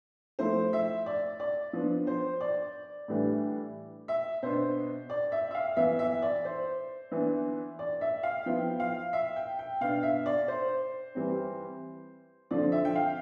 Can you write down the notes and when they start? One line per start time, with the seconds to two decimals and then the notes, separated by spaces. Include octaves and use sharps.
0.39 F3 A3 E4 C5
0.73 E5
1.06 D5
1.40 D5
1.73 F3 B3 D4
2.07 C5
2.41 D5
3.08 A2 E3 G3 D4
4.08 E5
4.42 B2 B3 D4 C5
5.10 D5
5.32 E5
5.51 E5
5.55 F5
5.77 E3 B3 E4 E5
5.99 E5
6.22 D5
6.45 C5
7.12 E3 B3 D4
7.79 D5
8.01 E5
8.23 F5
8.46 F3 B3 E4 G5
8.80 F5
9.13 E5
9.36 G5
9.59 G5
9.81 B2 B3 D4 F5
10.03 E5
10.26 D5
10.48 C5
11.15 E3 G3 C4
12.51 D3 F3 C4 D5
12.72 E5
12.85 G5
12.95 F5